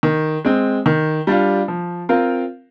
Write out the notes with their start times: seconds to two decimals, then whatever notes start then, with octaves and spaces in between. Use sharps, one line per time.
0.03 D#3
0.45 G#3 C4
0.86 D#3
1.27 G3 D4 F4
1.68 F3
2.09 C4 F4 A#4 F5